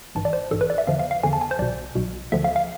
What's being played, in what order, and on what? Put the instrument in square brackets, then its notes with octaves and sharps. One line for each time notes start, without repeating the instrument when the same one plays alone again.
[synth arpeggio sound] A1 G#2 E3 A5
D5
C5
A1 G#2 E3 A4
B4
D5
E5
E2 D3 F3 F5
F5
F5
E2 D3 F3 G#5
A5
G#5
C5
B1 B2 D5
B1 B2
D2 D3 F3 E5
F5
F5